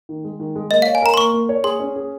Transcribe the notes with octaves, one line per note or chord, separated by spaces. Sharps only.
D#3
G#3
D#3
G#3
A#3 D#5
F5
C#5
G#5
A#4 A#5
C6
A#3 C#6
A#3
C#5
G#4 C6
C#4
G#4